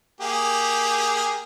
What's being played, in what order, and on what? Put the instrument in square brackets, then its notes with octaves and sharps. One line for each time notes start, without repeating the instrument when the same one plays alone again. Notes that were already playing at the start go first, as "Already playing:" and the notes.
[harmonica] A#3 G4 G#4